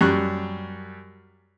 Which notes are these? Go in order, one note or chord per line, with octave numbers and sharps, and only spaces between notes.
F#2 G3 C#6 F#6